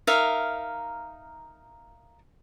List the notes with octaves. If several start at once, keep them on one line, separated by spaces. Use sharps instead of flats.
D#4 A#4 E5 F5